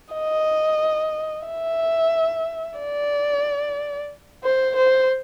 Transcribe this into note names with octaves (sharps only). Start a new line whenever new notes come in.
D#5
E5
D5
C5
C5